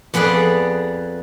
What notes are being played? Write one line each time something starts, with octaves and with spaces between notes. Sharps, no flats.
F2 B3 G#4 B4 D5